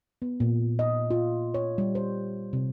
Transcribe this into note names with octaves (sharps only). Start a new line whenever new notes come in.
B3
A#2
D#5
F4
C#5
G3
C5
C3